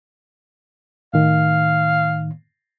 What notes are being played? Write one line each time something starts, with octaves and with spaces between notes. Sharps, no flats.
A2 D#3 F5